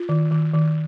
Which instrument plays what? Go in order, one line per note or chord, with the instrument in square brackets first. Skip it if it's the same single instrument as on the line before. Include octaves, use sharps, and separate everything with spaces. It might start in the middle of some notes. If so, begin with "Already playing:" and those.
Already playing: [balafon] F4
D#3
D#3
D#3